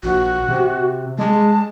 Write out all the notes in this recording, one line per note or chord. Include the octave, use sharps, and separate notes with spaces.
A#1 F#4
C3
G#3 A5